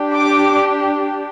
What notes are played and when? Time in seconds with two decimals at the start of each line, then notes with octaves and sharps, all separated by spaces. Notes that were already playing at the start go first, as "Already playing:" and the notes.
Already playing: D4 G4
0.15 D6